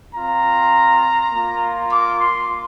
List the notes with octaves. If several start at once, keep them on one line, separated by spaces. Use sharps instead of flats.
C4 F4 A#5
A#3 F4
D6
C6